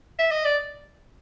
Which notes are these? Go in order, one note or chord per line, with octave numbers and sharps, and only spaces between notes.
E5
D#5
D5